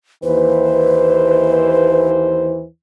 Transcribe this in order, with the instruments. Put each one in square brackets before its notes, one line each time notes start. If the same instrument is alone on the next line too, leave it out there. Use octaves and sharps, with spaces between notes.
[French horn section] D#2 E3 C5 [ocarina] B4